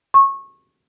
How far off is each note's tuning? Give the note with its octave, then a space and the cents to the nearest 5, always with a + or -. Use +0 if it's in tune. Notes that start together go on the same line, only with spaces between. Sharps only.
C#6 -20